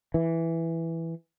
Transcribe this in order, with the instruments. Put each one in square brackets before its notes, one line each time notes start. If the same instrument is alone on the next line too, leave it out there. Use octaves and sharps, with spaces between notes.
[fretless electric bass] E3